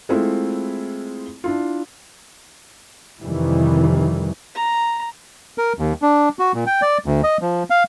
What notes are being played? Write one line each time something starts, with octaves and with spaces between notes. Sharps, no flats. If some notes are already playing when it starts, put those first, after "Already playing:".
G#3 A3 C4 E4 F4
D4 E4 F4
F2 C3 D#3 E3 G3
A#5
A#4
D#2
D4
F#4
A#2
G5
D5
D2
D#5
F3
F5